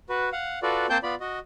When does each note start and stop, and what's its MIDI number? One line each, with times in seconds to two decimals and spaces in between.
0.09 0.29 66
0.09 0.29 71
0.32 0.59 77
0.32 0.59 78
0.63 0.87 65
0.63 0.87 66
0.63 0.87 69
0.63 0.87 71
0.63 0.87 74
0.90 0.98 58
0.90 0.98 60
0.90 0.98 72
0.90 0.98 79
0.90 0.98 81
0.90 0.98 91
1.03 1.15 59
1.03 1.15 65
1.03 1.15 74
1.03 1.15 83
1.20 1.39 66
1.20 1.39 75